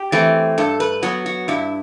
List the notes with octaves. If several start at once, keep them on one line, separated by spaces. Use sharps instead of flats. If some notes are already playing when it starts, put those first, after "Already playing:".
Already playing: G4
E3 A3 C4
G2 A4
B4
F#3 B3 F#4
F#4
G2 E4